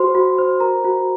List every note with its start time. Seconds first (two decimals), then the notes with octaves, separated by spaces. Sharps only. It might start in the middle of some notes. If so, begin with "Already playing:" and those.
Already playing: F#4 C5 C6
0.15 F#4
0.38 C5
0.60 A#4 A#5
0.84 F#4